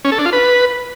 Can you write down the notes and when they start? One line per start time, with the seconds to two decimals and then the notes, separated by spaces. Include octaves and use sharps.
0.05 C#4
0.12 A4
0.19 D4
0.26 F4
0.33 B4